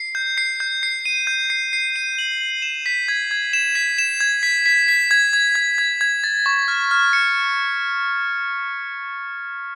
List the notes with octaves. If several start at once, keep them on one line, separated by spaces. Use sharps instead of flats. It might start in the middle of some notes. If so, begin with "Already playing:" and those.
Already playing: C7
G6
C7
G6
C7
D#7
G6
C7
C7
D#7
F#7
F#7
E7
B6
G#6
G#6
E7
B6
E7
G#6
B6
B6
B6
G#6
G#6
G#6
G#6
G#6
A6
C#6
F6
F6
C#7